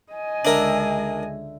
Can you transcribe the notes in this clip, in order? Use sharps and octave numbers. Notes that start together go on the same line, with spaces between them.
D#5 G#5
C#2 D3 G#3 D4 A#4 E5